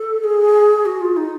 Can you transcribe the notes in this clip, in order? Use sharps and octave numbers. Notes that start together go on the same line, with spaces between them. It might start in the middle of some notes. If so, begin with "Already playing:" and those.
Already playing: A4
G#4
F#4
F4
D#4